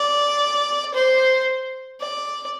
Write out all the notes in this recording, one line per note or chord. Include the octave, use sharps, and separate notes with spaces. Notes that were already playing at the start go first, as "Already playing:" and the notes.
Already playing: D5
C5
D5